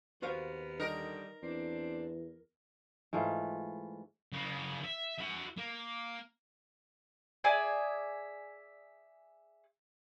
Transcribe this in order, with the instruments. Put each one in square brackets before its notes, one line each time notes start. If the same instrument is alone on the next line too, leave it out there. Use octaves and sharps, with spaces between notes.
[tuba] D#2 [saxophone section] B3 A#4 [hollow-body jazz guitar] F#4 C5 F5
[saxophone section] D3 D#3 G3 [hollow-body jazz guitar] D#4 [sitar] A#4
[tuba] E2 [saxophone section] C4 D4
[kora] G#2 E3 A3 F4
[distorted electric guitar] C#3 A#3
E5
F#4 E5
A#3
[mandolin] G#4 D5 E5 G#5